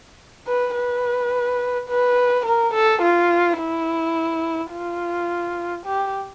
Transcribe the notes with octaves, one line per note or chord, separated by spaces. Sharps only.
B4
B4
B4
A#4
A4
F4
E4
F4
G4